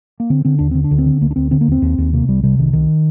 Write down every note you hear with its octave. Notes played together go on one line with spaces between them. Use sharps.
A#3
D3 C4
D3 C4
D#2 D4
D3 C4
D4
D2
C4
D3
D2 A#3
D4
D2 C4
D3 C4
A#3
D#2 C4
D#2
D#2
C3 A#3
C2 G3
C3 G3
C2 D#3
C2 D#3